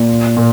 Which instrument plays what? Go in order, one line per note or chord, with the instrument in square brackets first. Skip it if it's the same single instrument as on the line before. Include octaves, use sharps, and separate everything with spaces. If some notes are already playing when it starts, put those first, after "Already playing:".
Already playing: [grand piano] A#2
A#2